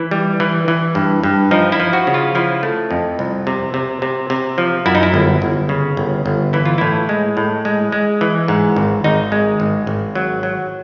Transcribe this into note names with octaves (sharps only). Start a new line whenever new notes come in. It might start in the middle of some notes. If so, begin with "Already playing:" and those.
Already playing: E3 E4
G3
E3
E3
G2
G2
F3 D#4
E4
F3
F#4
C#3
F4
F3 E4
A3
F2
C2
C3
C3
C3
C3
F3
F#2 E4
D#4
E4
G1
G1
C#3
G1
G1
E3 E4
F4
A2 E4
G#3
A2
G#3
G#3
E3
G#2
G#1
G#1 D#4
G#3
G#1
G#1
F#3
F#3